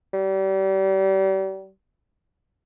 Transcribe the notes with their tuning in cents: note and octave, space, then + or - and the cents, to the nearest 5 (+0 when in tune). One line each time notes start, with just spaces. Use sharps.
G3 -35